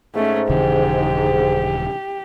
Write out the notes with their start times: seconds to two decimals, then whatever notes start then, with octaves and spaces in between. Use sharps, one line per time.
0.15 G#2 A3 C#4
0.49 D#1 C#3 E3 G4